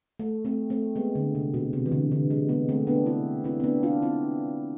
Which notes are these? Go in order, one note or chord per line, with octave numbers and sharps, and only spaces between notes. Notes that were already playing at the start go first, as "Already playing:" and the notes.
A3
A3 C4
A3 C4
G#3 B3
D3
C3
B2
C3
E3
D3
D3
G#3
G#3 B3
A3 C4
B3 D4
C4 E4
C4 E4
C4
B3 D4
D4 F4
C4 E4